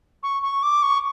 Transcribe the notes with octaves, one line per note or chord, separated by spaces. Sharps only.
C#6
C#6
D6
C#6